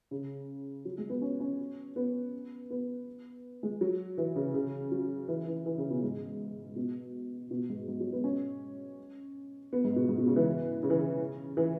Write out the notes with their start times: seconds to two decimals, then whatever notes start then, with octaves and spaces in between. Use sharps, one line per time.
0.11 C#3
0.85 F#3
0.98 G#3
1.10 B3
1.22 C#4
1.40 C#4
1.96 B3
2.70 B3
3.63 G#3
3.81 F#3
4.18 E3
4.36 C#3
4.54 C#3
4.92 F#3
5.28 E3
5.47 E3
5.66 E3
5.78 C#3
5.90 B2
6.03 G#2
6.76 B2
7.51 B2
7.69 G#2
7.88 G#2
8.00 F#3
8.13 B3
8.24 C#4
9.73 B3
9.84 G#2
9.96 B2
10.08 G#2
10.18 B2
10.27 C#3
10.36 E3
10.83 C#3
10.90 E3
10.98 C#3
11.57 E3